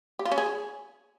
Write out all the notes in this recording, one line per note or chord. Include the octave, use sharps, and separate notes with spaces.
G4
F4
C#4
G#4